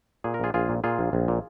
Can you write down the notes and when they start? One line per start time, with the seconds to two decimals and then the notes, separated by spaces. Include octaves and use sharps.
0.24 A#2 G#4
0.34 A#4
0.40 A#1 F4 G#4
0.54 A#1 F4 G#4
0.69 A#2
0.84 A#2 F4 G#4
0.99 A#1
1.13 A#1
1.28 A#2